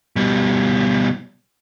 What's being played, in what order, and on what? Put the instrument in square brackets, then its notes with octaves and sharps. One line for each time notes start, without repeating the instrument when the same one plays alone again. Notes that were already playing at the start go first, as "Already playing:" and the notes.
[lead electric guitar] B2 G3